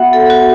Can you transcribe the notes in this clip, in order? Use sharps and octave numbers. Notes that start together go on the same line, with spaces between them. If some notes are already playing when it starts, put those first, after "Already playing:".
Already playing: B3 F#4 E5 F#5
A4
F#4